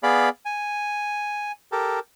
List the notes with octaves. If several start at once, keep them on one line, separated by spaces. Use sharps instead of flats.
B3 G#4 D5 F5 B5
G#5
G4 A4 A#4